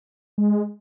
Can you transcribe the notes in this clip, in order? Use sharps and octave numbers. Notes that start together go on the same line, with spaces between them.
G#3